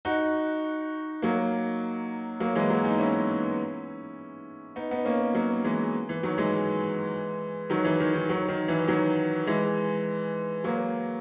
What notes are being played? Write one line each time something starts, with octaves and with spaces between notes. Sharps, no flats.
D#4 F#4
F#3 A#3
F#3 A#3
E3 G#3
F#3 A#3
B3 D#4
C#4 E4
B3 D#4
B3 D#4
A#3 C#4
F#3 A#3
E3 G#3
E3
D#3 F#3
E3 G#3
D#3 F#3
E3
D#3
D#3
D#3 F#3
D#3
E3
D#3 F#3
E3 G#3
F#3 A#3